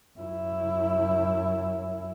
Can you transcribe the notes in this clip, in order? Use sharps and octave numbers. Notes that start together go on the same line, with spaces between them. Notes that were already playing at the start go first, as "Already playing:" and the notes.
F#2 E4